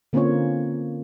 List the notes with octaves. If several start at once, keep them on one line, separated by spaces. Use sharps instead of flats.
D3 A#3 C4 C#4 F4 C#5